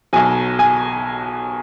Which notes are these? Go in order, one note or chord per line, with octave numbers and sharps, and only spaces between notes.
B1 B2 F#3 G#5
G#5